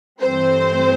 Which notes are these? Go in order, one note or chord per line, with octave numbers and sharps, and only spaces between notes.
G2 E3 A3 C4 C5